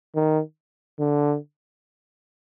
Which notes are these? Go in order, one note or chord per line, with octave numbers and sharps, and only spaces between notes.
D#3
D3